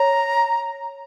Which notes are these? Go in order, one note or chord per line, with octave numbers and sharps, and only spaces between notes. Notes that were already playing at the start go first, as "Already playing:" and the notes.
Already playing: C#5 A#5